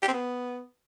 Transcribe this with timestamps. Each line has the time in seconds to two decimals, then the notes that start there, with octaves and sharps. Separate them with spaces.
0.02 G4
0.08 C4
0.13 B3